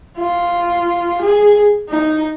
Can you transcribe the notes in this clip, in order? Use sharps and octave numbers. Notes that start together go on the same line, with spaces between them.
F4
G#4
D#4